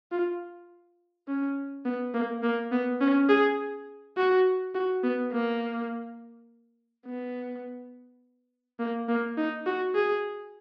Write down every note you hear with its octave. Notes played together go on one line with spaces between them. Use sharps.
F4
C#4
B3
A#3
A#3
B3
C#4
G#4
F#4
F#4
B3
A#3
B3
A#3
A#3
D#4
F#4
G#4